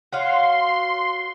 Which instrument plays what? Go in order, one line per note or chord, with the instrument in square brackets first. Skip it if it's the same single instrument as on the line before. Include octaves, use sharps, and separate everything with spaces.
[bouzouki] F#4 C#5 F5 [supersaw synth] C6